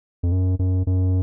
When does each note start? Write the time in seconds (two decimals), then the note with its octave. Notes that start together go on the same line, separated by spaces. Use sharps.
0.23 F2
0.32 F#2
0.59 F#2
0.87 F#2